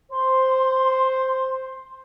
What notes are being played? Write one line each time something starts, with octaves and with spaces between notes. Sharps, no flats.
C5 C6